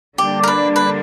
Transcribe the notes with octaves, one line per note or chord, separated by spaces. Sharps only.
D3 G3 A#3 D4 G4
A#4
B4
B4